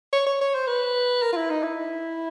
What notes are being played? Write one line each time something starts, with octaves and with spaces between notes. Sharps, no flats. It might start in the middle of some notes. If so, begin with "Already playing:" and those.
C#5
C#5
C#5
C5
B4
A#4
F4
E4
D#4
E4